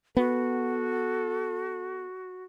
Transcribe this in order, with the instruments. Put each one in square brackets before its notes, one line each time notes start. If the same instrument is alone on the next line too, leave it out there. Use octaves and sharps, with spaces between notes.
[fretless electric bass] B3 [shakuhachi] F#4 [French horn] A4